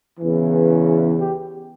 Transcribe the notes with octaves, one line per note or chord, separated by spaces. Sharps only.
E2 C#3 E3
G4